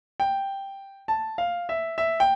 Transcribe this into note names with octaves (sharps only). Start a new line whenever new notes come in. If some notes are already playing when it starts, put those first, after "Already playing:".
G5
A5
F5
E5
E5
G5